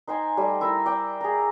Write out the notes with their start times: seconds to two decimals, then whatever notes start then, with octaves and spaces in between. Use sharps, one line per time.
0.07 D#4 C5 G5 G#5
0.37 G3 A3
0.61 E4 A#4 E5
0.86 D5 G5
1.21 G#4 A#5